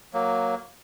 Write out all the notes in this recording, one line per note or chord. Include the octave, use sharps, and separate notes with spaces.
F#3 A#3